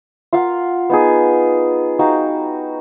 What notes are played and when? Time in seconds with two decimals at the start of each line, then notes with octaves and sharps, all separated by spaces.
0.33 F4 A#4 F5 F#5
0.90 B3 D#4 G#4
1.99 D#4 F#4 F5 G5